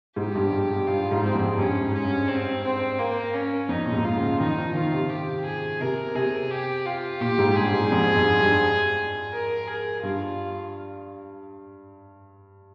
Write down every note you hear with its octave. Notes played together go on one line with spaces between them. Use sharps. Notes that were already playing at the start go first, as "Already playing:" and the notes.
G#2 G4
G2
G2
G2
G2 F4
G#2
C4
F2
G2 C#4
G#2
C#4
G2
C4
C4
A#3
C#4
F2 D#4
A#2
G#2
F4
C#3
D#3 D#4
F3
D#3 F4
C3
G4
G#4
C3 A#4
C3 G#4
G4
F4
A#2 G4
G#2
G2 G#4
G#2
F2
G2
G2
A#4
G#4
G2 F4